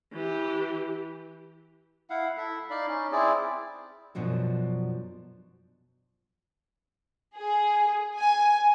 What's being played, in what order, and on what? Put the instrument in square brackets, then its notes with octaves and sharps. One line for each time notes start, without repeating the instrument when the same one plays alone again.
[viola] E3 G4
[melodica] E4 F5 F#5
E4 A4 E5
D#4 D5 F5 B5
C#4 D#4
C4 E4 G#4 D5
[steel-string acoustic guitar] F#2 B2 F3 F#3 D4
[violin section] G#4
G#5